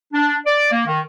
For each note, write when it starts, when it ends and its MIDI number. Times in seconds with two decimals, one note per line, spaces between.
0.13 0.35 62
0.47 0.72 74
0.72 0.84 58
0.87 1.00 51